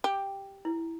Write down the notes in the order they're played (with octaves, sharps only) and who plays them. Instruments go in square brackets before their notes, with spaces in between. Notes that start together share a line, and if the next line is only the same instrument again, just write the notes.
[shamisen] G4
[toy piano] E4